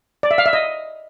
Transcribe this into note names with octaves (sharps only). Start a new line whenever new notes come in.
D5
E5
F5
E5
D#5